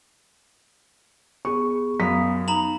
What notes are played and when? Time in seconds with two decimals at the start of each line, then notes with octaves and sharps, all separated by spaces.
1.45 B3 G#4 C#6
2.00 F#2 B3 F5 D#6 B6
2.48 D#4 A#5 B5 F#7